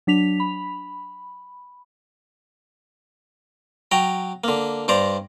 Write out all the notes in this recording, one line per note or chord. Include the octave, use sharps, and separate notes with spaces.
F#3 D4 B6 F7
B5
F#3 G5 A#5
D3 A#3
G2 C5 D5 A#5